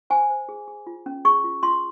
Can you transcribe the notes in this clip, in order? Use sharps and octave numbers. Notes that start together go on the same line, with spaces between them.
C5 G#5
C5
G#4
G#4
F4
C#4
G#4 C#6
F4
F4 C6